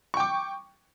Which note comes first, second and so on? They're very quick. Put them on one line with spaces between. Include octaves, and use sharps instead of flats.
C#6 G5 D6